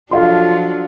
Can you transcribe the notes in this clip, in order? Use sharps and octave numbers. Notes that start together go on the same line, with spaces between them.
F3 F#3 D4 F4 A4 F5 C6